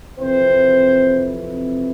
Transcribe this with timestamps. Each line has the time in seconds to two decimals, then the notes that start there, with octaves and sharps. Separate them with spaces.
0.19 F2 C3 E3 C4 C5